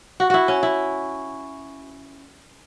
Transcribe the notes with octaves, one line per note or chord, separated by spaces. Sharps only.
F#4
E4 F#4
C#4
E4